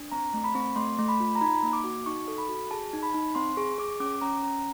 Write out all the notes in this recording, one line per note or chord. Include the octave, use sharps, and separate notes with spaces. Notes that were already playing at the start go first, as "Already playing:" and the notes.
Already playing: D4
C4 A#5
A3
B5
C4
A3 C6
A3
B5
F4
A#5
D#4 B5
A#3
D6
F#4
D#4 C#6
A4
B5
F#4
G#4 A5
D#4
B5
D#4
C4 C6
G#4 C#6
G#4 D6
C#4 D6
C#4 A#5
C#4 A#5